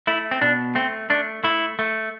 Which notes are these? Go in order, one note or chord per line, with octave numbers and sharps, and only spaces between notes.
A3 E4
C4
B2 D4
A3 C4
A3 D4
A3 E4
A3